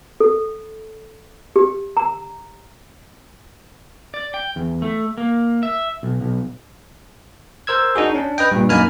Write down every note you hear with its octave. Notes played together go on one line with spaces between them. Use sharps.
A4
G4
A#5
D5
G5
E2
A3
A#3
E5
B1
B1
A#4 C5 E6 G#6
D4 D#4 F#4 G#4
C#4 D4
B4 D#5 G5
G2 A#2
F#2 A#3 D#4 G#5 B5 F6